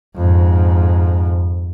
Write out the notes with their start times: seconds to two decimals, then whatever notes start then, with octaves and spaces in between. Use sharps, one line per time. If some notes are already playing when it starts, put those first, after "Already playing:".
0.16 F2 G#2